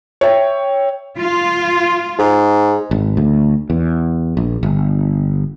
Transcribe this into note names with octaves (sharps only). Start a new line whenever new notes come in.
C#5 E5 G5
F4
G#2
G#1
D2
E2
A#1
G1